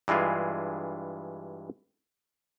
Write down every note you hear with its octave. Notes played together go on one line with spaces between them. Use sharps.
G2 E3 G#3 F4 G#4